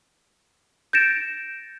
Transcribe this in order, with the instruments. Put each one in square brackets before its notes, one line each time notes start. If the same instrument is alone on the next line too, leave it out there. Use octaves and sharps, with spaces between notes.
[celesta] G6 A6 A#6 C#7 D7 E7